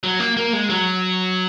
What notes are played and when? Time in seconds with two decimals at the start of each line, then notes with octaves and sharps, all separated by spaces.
0.03 F#3
0.20 A#3
0.37 A#3
0.53 G#3
0.70 F#3